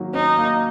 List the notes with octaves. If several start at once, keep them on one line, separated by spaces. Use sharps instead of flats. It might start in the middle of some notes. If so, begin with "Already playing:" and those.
Already playing: D#3 F#3 A#3
C#4 D#4
A#3